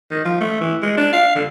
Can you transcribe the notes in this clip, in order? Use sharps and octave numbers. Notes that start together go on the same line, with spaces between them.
D#3
F3
A3
E3
G#3
D4
F5
D3